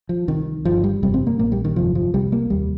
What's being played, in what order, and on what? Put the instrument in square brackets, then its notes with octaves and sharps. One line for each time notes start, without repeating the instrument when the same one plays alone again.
[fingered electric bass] F3
C2 C3 D#3
G1 G2 F3
G3
G1 F2 C3 G3
C4
A#3
A#1 A#2 A#3
G3
D#3
G1 F2 C3 F3
F3
C2 C3 G3
A#3
F1 D#2 G3